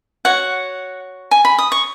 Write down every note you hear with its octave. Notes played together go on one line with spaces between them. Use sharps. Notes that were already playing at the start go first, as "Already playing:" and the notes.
F#4 C#5 F#5
G#5
B5
D#6
C#6